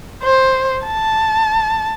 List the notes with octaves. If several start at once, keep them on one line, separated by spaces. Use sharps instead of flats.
C5
A5